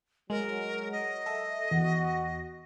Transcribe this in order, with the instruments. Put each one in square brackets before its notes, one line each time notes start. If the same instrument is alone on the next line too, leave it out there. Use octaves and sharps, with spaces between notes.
[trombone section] F#3 [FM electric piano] G#3 [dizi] A#4
[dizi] D#5
[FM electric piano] A4 E5
[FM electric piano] E2 [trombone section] F#4